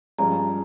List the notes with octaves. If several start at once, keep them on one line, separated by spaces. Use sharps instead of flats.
G2 F3 G#3 C#4 A#5